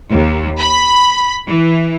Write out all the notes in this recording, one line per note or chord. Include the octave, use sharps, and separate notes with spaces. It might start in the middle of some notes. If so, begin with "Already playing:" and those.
D#2
B5
E3